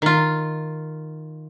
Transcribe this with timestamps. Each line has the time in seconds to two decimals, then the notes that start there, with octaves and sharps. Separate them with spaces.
0.02 D#3 F4